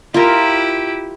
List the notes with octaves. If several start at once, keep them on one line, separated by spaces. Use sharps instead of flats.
E4 F4 G4 A#4